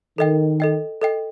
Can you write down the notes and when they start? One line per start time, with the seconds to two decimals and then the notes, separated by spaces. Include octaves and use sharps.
0.18 D#3 A4 D#5 G5
0.60 A4 D#5 G5
1.01 A4 D#5 G5